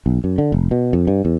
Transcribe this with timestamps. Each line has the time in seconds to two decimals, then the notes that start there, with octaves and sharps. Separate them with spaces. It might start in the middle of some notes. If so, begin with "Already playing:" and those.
0.06 B1
0.24 F#2
0.38 D3
0.52 F1
0.71 B2
0.93 F2
1.07 G2
1.25 E2